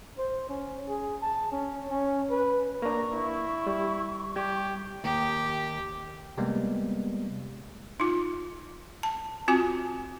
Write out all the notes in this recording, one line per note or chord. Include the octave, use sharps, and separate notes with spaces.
C5
C#4
G#4
A5
C#4
C#4
B4
A#3 D4 A#5 C#6
E4
G3
G3 G4 G#6
D#2 G4
C3 G3 G#3 A#3 B3
D#4 F4
A5
C4 F4 F#4 G#5